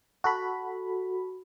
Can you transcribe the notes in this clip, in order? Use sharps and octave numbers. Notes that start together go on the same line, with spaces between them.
F#4 A4 B5